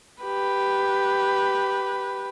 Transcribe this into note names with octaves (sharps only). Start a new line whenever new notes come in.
G4 B4